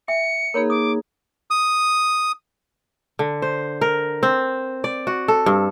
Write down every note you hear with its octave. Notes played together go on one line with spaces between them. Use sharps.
E5 G5 G#5 C#7
A#3 D#4 G#4 A#4 C#5 B5
D6 D#6
D#6
D3
C5
A#4
C4
D5
F#4
A4
G2